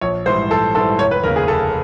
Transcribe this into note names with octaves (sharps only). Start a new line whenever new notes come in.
A#1 C#5
G#2 E3 G3 C5
A#1 A4
G#2 E3 G3 A4
F1 C#5
B4
D#2 C#3 A#4
G#4
F1 A4